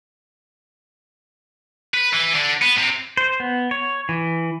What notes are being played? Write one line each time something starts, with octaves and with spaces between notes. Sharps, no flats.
B4
E3
D3
B3
C3
C5
B3
C#5
E3